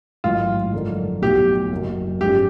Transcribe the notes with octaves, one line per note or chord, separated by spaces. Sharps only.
A1 G#2 D#3 F#3 F4
F#2 D3 F3 A#3 D#4
B1 A2 F#3 G4
F#1 F#2 D#3 F#3
G#2 F3 G#3 C#4 G4